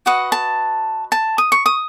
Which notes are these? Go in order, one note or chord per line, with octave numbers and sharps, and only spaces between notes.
F#4 B4 D#5 F#5
A5
A5
D#6
C#6
D#6